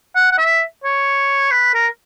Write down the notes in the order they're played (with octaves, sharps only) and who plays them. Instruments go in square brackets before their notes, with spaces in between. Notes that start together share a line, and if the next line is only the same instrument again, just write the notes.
[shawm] F#5
F#5
E5
C#5
B4
A#4